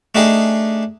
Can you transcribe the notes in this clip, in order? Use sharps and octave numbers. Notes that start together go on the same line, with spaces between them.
A3 D4 D#4 G4 G#4